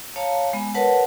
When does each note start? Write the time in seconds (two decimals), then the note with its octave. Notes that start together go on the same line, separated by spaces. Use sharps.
0.16 C#5 F5 A5 A#5
0.53 G#3 B3
0.74 A#4 B4 C#5 F#5 A5